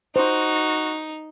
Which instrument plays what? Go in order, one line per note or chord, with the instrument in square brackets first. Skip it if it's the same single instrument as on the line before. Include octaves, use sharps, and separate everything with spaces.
[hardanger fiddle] D#4 [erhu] F#4 [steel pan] C5